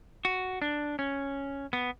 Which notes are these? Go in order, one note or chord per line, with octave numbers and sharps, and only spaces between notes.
F#4
D4
C#4
B3